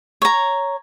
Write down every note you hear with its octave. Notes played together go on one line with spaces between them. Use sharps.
C#5 A#5